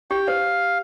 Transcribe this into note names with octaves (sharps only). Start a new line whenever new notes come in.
G4 G5
C5 F5